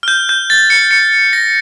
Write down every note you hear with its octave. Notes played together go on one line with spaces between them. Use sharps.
F6
G6
G6
A6
C#7
C#7
A#6